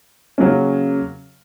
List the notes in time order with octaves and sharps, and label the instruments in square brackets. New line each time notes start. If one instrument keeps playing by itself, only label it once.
[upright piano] C#3 F#3 A#3 C#4